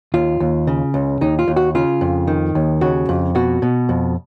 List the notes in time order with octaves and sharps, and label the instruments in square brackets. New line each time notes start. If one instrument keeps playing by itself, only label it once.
[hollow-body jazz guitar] D#2 F4
D#2
C#3
C#2
D#2 D#4
F4
D#2
F#4
C#3 F4
F2
D#3
D#2
C#3 F#4
F2
B2 F#4
B2
F2